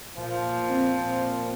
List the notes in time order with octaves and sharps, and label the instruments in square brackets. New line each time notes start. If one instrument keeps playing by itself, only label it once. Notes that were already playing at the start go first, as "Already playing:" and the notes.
[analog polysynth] A#2 [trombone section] F3
[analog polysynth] A#2
C4
A#2
A#2